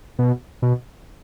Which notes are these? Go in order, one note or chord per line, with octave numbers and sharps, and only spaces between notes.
B2
B2